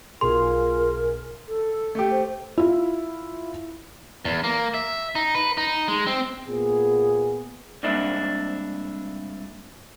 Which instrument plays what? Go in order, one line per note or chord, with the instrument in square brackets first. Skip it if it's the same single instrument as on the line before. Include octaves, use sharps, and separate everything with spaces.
[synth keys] B1 B2 G#4 [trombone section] F4 [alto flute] A#4 [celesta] C6
[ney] A4
[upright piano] A3 G4
[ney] C5
[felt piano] E4 F4
[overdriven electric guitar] E2
A#3
E5
D#4
B4
D#4
G#3
C4
[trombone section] A#2 B3 G#4
[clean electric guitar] C2 G#2 A#3 D4 E4